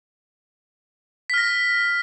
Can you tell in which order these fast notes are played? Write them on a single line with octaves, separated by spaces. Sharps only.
B6 F6 A#6